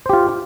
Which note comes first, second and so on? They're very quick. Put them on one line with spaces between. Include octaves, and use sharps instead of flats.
C5 G4 F4